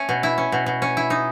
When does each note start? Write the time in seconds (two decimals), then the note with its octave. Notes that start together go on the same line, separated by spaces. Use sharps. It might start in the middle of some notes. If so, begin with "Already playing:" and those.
Already playing: A3 C#4
0.09 B2
0.23 E4
0.38 C#4
0.52 B2
0.66 B2
0.82 C#4
0.97 E4
1.10 D#4